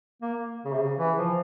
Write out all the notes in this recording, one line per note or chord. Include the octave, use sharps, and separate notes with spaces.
A#3
C#3
C3
C#3
E3
F3